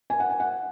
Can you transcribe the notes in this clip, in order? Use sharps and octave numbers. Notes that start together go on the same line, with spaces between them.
G#5
F#5
G#5
F#5